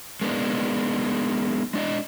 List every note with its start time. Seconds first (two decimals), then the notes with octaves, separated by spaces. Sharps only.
0.21 G#3 A#3 B3 D4 D#4
1.74 G#3 D4 D5 D#5